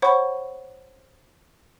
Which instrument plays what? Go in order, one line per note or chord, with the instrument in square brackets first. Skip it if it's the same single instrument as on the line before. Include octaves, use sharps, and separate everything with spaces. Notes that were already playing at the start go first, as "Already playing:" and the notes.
[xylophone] C5 C#5 F#5 B5 C#6